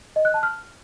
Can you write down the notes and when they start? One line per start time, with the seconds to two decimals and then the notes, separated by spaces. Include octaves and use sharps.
0.16 D#5
0.25 F#6
0.34 A5
0.43 F6